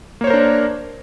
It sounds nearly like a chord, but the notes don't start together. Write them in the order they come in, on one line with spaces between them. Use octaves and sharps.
A#3 C#5 C5 A#4 D4